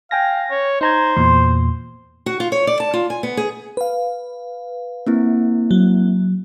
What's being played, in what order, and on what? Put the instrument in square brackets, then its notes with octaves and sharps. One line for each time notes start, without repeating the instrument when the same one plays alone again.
[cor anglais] F5 [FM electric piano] G5 G#5 A#6
[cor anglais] C#5
[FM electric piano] D#4 A#5 G#6 [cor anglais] C5
[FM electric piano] E2 A#2 C6
[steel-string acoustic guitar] F#4
F4
C#5
D5
A5
F4
G#5
B3
G#4
[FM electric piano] B4 F5
[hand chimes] A#3 C4 E4
[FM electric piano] F#3